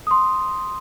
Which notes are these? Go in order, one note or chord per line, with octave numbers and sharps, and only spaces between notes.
C6 D#6